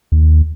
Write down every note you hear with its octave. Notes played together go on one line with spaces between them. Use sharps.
D#2